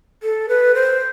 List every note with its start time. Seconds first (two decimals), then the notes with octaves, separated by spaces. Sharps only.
0.23 A4
0.49 B4
0.75 C5